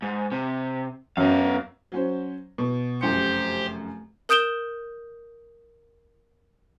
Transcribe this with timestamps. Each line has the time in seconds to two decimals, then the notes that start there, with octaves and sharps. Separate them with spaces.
0.02 G#2
0.32 C3
1.17 F#2 B3 F5
1.92 F#3 C#4 C5
2.58 B2
3.01 F1 F#2 G4 C5 C#7
4.29 A#4 D#6 G6 D7 E7 G7